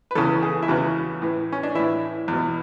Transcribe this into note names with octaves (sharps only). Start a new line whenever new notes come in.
B4
E2 C#3 E3 A4
G#4
E4
E2 C#3 E3 F#4
A2 E3
C#4
D4
A2 E3 E4
E2 B2